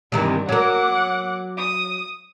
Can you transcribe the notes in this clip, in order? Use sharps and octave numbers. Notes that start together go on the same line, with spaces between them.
G2 C3 D#3 E3 G3
F#3 A#4 F#5 D6
D#6